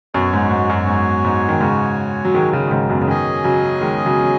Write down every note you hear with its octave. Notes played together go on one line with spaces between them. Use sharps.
F#2 B2 F#4 C#5 G#5
G#2
G#2
F#2
G#2
G#2
D#3
G#2 C#3
F#3
D#3 G#3
C#3 F#3
D#3
G#2 C#3
F#2 B2
C#3
B2 D#3 C#4 G#4 D#5 G#5
C#3 F#3
D#3 G#3
C#3 F#3
F#3